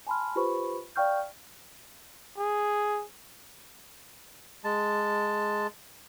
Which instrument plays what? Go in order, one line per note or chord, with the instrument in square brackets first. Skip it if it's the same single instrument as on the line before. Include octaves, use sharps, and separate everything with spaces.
[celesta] G#5 A5 B5 C6 F6
F4 G4 B4 C5 B5 C#6
D5 F5 G5 C#6 F6 G6
[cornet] G#4
[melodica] G#3 A5